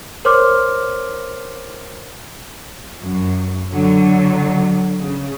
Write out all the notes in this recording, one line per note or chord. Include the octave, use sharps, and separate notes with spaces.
A#4 C5 C#5 C6 D6 F6
F#2
D3 F#3
C#3